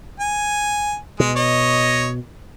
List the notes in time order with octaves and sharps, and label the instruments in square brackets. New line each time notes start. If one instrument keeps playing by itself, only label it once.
[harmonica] G#5
[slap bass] B2 [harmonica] G#3
[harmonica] C#5 D#5